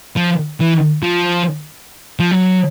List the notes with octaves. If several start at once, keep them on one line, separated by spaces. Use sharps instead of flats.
F3
E3
F3
F3
F#3